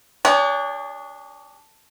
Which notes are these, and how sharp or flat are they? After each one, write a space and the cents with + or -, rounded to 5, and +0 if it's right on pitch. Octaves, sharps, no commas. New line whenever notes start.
D4 +0 G#4 -40 C#5 +40